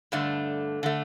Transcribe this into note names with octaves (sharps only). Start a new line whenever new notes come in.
G2 D3 A3
D3 A3